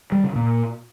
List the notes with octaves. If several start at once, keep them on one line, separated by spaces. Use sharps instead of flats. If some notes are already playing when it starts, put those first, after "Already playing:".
G3
C#3
A#2